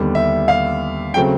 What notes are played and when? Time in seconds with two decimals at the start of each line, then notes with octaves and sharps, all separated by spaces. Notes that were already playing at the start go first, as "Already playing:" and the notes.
Already playing: D#2 D3 G3 B3
0.15 E5
0.48 F5
1.14 C#3 F#3 A3 C4 G5